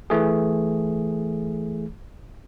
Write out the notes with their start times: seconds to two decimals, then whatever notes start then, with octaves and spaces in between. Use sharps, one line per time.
0.10 E3 A3 G#4